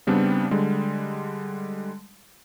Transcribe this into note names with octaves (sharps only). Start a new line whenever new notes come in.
C#3 G3 B3 C4 D4
D3 G3 G#3